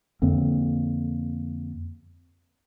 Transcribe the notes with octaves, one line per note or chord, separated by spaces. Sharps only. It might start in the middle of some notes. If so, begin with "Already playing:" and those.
F2 D3 A#3 C4